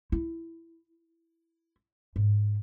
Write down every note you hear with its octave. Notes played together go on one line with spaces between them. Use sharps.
E4
G#2